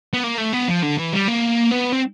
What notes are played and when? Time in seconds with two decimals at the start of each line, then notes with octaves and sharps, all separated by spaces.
0.14 B3
0.24 A#3
0.38 A3
0.53 B3
0.68 F3
0.83 D3
0.98 E3
1.13 G3
1.28 A#3
1.72 B3
1.93 C4